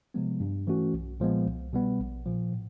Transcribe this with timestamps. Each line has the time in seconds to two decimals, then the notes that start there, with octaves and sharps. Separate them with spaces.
0.14 C3 F3 G#3 B3
0.40 G2
0.67 E3 A3 C#4 F#4
0.93 B1
1.20 A#2 F3 G#3 B3
1.47 C2
1.73 B2 G3 B3
2.00 A#1
2.26 A#2 F3
2.53 A2